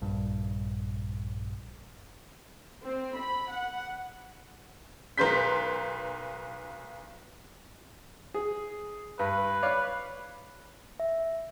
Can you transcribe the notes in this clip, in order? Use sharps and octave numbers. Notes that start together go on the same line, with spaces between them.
A#1 G2
C4
B5
F#5
B1 A#4 B4 C6 G6 B6
G#4
G2 B4
C#5 D5 F5
E5